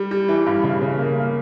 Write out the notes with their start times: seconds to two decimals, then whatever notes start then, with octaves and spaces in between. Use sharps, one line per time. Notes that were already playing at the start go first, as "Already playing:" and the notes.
Already playing: G3
0.11 G3
0.28 E3
0.46 G2
0.64 C#3
0.82 C#3
0.99 A#3
1.16 A#3